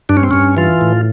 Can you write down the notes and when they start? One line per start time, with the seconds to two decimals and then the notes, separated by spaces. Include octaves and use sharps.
0.09 G2 D4
0.17 C#4
0.23 C4
0.31 G2 C#4
0.57 E3 F4
0.81 A2